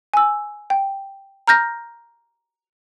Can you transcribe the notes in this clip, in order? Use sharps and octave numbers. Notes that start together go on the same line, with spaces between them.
G#5 E6
G5
A#5 F6 G6 A#6